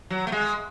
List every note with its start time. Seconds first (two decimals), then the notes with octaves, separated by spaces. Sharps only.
0.10 F#3
0.27 A3
0.32 G#3